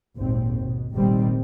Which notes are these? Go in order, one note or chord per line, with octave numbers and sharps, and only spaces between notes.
G#1 D#2 A#2 C4
B2
F1 A#1 D#3 G3 C4